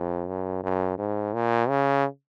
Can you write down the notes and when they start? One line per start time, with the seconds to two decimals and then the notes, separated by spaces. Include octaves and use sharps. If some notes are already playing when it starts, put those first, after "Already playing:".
Already playing: F2
0.28 F#2
0.63 F#2
0.98 G#2
1.34 A#2
1.69 C#3